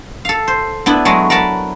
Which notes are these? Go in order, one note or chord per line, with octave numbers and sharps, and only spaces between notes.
A4 F5
C5
B3 D4 E4
F#3 G#3 A3
A#4 B4 F#5 A5 B5